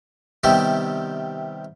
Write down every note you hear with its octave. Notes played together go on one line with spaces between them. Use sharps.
C3 D#3 G3 B3 E4 G4